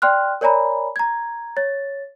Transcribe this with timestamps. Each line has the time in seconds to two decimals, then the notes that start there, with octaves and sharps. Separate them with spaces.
0.02 D5 G5 C6 F6 F#6
0.41 A#4 C#5 D5 G#5 A#5 B5
0.96 A#5 G#6
1.57 C#5 A6